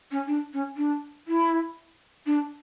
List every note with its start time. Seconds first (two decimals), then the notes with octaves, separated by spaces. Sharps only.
0.11 C#4
0.26 D4
0.52 C#4
0.76 D4
1.27 E4
2.26 D4